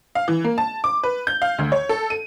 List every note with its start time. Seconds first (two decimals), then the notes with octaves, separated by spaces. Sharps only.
0.15 F5
0.28 E3
0.44 A#3
0.58 A5
0.84 D6
1.03 B4
1.27 G6
1.42 F5
1.58 D2
1.72 C#5
1.89 A4
2.10 D#7